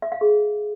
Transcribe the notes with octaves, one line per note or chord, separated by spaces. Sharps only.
E5
F5
G#4